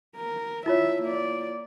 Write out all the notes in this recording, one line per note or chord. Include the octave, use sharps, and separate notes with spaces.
A#4
E4 F4 C#5 E5
A#3 D5